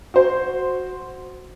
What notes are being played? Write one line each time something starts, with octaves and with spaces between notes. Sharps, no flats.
F#4 C5